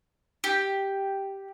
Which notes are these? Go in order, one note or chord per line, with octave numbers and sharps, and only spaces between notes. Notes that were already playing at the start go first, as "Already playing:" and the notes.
G4